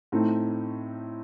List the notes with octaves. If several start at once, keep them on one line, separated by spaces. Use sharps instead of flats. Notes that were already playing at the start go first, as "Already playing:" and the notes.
A2 A3 C4 D#4